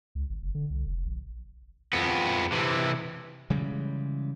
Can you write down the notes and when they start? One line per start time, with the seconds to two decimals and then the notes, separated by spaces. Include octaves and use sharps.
0.15 C#2
0.30 G#1
0.43 F#1
0.55 D3
0.70 C2
0.86 F1
1.05 A#1
1.93 F2 B3
2.52 C3 E3
3.50 C#3 E3 G3 G#3